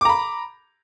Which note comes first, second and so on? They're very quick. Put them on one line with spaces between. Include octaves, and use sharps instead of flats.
D6 A#5 B5